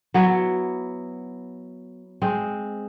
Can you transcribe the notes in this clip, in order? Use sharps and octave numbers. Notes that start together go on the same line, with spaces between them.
F#3 B3 E4
G#3 C4